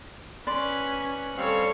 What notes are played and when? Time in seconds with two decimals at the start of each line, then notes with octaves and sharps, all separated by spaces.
0.47 C#4 B4 D5 C6 F#6
1.37 G3 C4 A4 C#5 F5